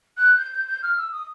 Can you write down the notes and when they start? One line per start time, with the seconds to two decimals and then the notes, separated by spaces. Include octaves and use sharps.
0.17 F#6
0.37 G6
0.52 G6
0.67 G6
0.82 F6
0.97 E6
1.11 D#6